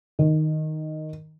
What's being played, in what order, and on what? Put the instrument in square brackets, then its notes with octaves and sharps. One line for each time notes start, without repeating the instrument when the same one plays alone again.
[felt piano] D#3